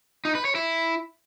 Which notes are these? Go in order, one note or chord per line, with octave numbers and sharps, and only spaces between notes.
D#4
B4
C#5
E4